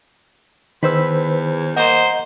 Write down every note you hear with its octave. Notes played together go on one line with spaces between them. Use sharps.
E2 D#3 B4 C5 E6
A#3 C5 D#5 F#5 A#5